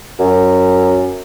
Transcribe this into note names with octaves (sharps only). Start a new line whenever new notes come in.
F#2